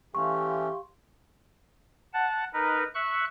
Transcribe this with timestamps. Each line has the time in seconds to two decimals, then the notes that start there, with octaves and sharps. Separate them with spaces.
0.15 E3 A3 C#4 G4 F5 C6 C#6
2.14 F#5 A5
2.53 D#4 A#4 B4
2.95 E5 C#6 F#6